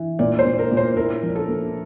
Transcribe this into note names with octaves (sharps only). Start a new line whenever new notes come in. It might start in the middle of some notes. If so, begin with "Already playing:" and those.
Already playing: E3
A#2 D5
C5
A#2
A#4
A#2
C5
E4 A#4
F3
A4
A#3